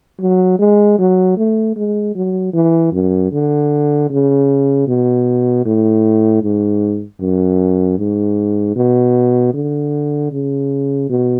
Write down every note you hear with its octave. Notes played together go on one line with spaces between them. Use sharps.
F#3
G#3
F#3
A3
G#3
F#3
E3
F#2
D3
C#3
B2
A2
G#2
F#2
G#2
B2
D3
C#3
B2